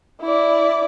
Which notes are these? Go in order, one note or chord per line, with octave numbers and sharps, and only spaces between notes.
E4 D5